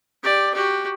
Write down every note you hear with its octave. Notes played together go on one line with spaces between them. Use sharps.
G4 D5
F#4 G4